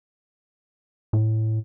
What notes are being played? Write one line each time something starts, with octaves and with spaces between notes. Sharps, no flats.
A2